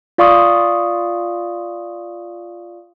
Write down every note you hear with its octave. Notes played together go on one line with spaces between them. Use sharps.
F4 D5 F5 C6 C#6 D#6